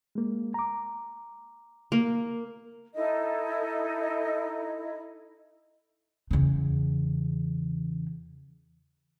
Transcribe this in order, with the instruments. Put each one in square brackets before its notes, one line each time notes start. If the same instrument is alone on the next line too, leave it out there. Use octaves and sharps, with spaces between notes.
[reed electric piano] G#3 A#3
A#5 D6
[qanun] A#3
[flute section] D#4 E4 A4 D#5
[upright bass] E2 C#3